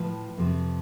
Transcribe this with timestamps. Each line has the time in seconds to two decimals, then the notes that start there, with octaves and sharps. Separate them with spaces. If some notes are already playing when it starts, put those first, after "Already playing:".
Already playing: A2 F3 B4
0.37 F2 C3 F3